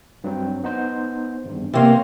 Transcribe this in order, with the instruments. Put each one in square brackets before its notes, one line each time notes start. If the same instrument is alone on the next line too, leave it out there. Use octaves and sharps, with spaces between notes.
[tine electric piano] G2 F#3 C4
B3 D#4 C5
G#1 E2 G2
[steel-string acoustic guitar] C3 A#3 [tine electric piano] E3 C#5 C6